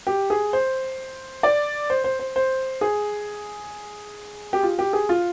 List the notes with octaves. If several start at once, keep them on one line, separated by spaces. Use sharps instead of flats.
G4
G#4
C5
D5
C5
C5
C5
C5
G#4
G4
F4
G4
G#4
F4